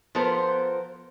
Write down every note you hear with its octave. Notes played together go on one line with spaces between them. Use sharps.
F3 B3 A4 A#4 C5